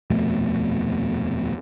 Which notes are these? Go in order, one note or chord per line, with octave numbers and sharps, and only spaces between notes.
D#1 F2 B2 A3